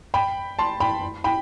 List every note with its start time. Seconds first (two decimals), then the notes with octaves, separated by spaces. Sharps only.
0.14 G5 B5
0.59 A5 C6
0.80 G5 B5
1.24 G5 B5